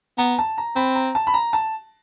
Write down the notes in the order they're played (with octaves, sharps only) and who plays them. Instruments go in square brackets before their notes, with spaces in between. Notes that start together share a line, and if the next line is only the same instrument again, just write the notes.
[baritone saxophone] B3 [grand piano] A#5
[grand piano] A5
A#5
[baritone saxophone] C4 [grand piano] B5
[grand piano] A#5
A5
B5
A#5
A5